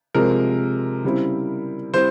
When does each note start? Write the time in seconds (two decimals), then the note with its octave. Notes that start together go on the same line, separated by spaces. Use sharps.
0.15 C3 F3 G#3 A#4
1.04 C#3 G3 C4 E4
1.93 G3 C4 E4 C5